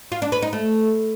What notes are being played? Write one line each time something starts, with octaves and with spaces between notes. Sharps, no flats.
F4
D4
B4
D#4
A3